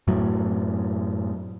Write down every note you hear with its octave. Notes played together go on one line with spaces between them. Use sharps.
F#2 A2 F#3